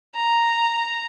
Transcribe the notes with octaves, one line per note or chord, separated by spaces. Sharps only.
A#5